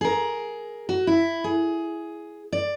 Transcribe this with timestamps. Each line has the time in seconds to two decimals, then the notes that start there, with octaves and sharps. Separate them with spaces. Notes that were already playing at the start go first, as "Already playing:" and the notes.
0.01 G#4 A#4
0.89 F#4
1.07 E4
1.44 G#4
2.53 D5